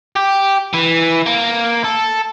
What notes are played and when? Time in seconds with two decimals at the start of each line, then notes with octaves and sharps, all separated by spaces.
0.16 G4
0.73 E3
1.26 A#3
1.84 A4